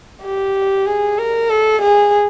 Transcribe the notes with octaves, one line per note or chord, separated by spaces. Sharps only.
G4
G#4
A#4
A4
G#4